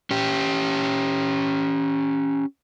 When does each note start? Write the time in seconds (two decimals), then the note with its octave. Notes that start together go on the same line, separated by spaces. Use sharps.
0.11 C#4 G4